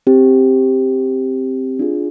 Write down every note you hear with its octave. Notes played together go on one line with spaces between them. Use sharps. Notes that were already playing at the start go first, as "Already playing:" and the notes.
C4 G4
D4 F4 G#4